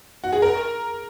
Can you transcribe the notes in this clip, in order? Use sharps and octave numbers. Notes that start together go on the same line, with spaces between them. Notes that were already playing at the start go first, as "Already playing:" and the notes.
F#4
G#4
A#4